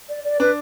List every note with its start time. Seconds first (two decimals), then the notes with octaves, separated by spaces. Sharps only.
0.09 D5
0.24 D5
0.40 D4 B4